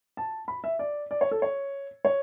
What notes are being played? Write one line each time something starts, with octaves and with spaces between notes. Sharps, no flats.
A5
B5
E5
D5
D5
C#5
A4
C#5
C#5